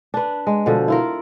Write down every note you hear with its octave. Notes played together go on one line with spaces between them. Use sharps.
D4 B4
G#3
B2 D3 F3
E4 F4 A#4